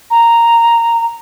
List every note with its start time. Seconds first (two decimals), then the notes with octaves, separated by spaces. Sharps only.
0.11 A#5